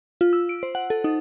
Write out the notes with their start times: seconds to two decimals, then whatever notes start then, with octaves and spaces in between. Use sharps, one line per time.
0.21 F4
0.33 E6
0.49 D7
0.63 C5
0.75 F#5
0.90 A4
1.04 D#4